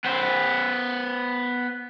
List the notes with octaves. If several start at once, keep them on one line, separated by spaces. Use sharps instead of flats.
B3 C5